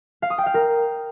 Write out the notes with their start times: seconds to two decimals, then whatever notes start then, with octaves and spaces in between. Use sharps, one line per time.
0.22 F5
0.30 D#6
0.38 G5
0.46 F5
0.54 A#4